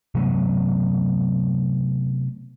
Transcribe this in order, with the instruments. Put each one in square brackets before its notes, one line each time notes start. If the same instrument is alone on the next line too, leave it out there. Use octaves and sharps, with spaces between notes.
[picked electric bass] C3 F#3 A3 B3